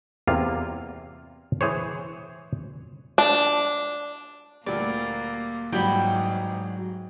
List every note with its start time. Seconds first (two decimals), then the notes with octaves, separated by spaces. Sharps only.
0.27 E2 C3 A#3 F4 F5
1.61 E3 G#4 C5 C#5
3.18 D4
4.66 D2 A#2 G3 A#3 D5
5.72 G1 G#2 E3 F#3 G3 F#4 G5 B5